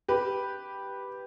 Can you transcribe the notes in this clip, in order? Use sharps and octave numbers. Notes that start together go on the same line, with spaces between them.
G4 B4